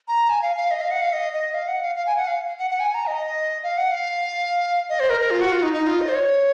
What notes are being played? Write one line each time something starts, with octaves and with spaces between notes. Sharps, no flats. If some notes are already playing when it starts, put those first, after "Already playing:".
A#5
G#5
F5
F5
D#5
F5
F#5
F5
D#5
D#5
F5
F#5
F5
F5
G#5
F#5
F5
F#5
F#5
G#5
A#5
D#5
F5
F#5
F5
D#5
C5
A#4
A#4
F4
F#4
F4
D#4
D#4
F4
D#5
C5
C#5